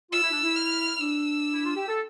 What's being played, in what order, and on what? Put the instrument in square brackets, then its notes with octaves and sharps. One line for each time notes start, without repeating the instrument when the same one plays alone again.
[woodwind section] F4 [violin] E6
[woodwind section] E4
D4
E4
[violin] F6
[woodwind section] D4 [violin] E6
[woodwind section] E4
F4
G4
A4